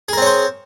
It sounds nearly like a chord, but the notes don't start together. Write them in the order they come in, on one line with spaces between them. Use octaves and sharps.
G#4 A#4 C4 C#5 C5